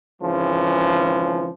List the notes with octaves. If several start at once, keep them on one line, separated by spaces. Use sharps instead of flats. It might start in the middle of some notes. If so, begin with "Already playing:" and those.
G#1 C#3 E3 F3